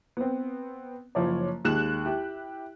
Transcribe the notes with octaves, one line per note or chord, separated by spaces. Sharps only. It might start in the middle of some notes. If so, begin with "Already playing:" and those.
B3 C4
F#1 F3 C#5 D5
D#2 G#3 F#6 E7
E4 G4